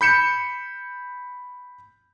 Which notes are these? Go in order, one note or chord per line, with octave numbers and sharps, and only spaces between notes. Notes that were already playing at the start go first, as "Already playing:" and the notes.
B5 G6 C#7 E7